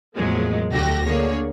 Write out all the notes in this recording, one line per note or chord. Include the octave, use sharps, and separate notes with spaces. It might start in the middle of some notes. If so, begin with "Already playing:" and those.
E2 A2 F3 F#3 G#3 A#3
D2 A3 F#4 G4 A#6
D3 A#3 G#4 C#5